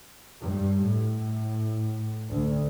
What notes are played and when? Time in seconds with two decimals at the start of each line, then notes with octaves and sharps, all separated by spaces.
0.41 G2
0.85 A2
2.30 D2